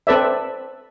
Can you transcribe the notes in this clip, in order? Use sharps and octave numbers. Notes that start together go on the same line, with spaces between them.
C4 A4 B4 D5 E5